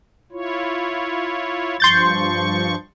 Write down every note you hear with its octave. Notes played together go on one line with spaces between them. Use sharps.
E4 F4 C#5
G2 F3 C6 C#6 G6 A6